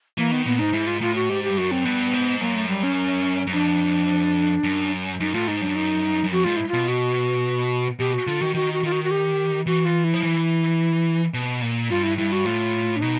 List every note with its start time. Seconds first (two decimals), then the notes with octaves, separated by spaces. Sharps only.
0.18 E3 A#3
0.31 D#3 B3
0.46 A#2 B3
0.59 G#2 D#4
0.73 G#2 E4
0.87 F4
1.01 A2 F4
1.15 F#4
1.29 G#2 G4
1.43 G4
1.49 G2
1.58 F#2 F#4
1.71 C4
1.85 G2 B3
2.13 G#2
2.41 F#2 A#3
2.55 A3
2.68 G3
2.83 C#4
3.47 F#2
3.53 F2 D4
4.64 F#2
5.20 F#2 D#4
5.34 A2 F4
5.48 G#2 D#4
5.61 F#2 D4
5.76 D#4
6.24 F#2
6.32 F2 F#4
6.44 G#2 F4
6.56 E4
6.69 B2 F4
6.88 F#4
7.99 B2 G4
8.14 F#4
8.27 D3 F4
8.41 D#3 F#4
8.55 D#3 F#4
8.73 F#4
8.83 D#3 F4
8.92 F#4
9.04 F#4
9.11 G4
9.66 E3 F#4
9.85 F4
10.04 E4
10.14 F3
10.23 E3
11.34 B2
11.62 A#2
11.90 G2 F4
12.03 E4
12.18 G2 E4
12.32 F#4
12.46 A2 F4
12.96 D4
13.01 B2 D#4